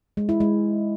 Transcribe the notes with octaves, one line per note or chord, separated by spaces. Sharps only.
G#3
E4
G#3